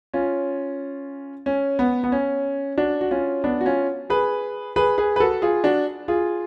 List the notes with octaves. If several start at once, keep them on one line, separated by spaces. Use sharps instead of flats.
C#4 F4
C#4
B3
B3
C#4
D4 F#4
F#4
C#4 F4
B3 D4
F#4
C#4 F4
G#4 B4
G#4 B4
G#4 B4
B4
F#4 A4
F4 G#4
D4 F#4
F4 G#4